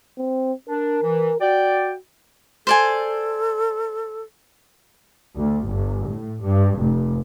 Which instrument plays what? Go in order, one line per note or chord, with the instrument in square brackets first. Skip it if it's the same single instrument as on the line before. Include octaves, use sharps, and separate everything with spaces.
[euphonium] C4
[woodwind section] D4 [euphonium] A#4
[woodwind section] E3
[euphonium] F#4 [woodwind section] D5 G5
[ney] A4 [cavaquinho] C5 D5 G#5
[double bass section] D2
G1
A2
G2
F1